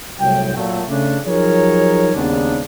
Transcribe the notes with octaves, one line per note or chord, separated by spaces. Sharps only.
C2 A2 F#3 G5
A#2 F#3 A3
C#3 A3 D4
F3 F#3 D#4 G#4 A#4 C#5
D#2 G#2 C#3 B3 D4